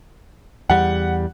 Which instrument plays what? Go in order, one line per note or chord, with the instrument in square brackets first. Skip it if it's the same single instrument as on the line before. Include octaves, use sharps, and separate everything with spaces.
[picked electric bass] E2 G3 [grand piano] F#5